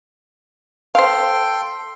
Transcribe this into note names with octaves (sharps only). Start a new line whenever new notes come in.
A4 C5 F5 G5 C6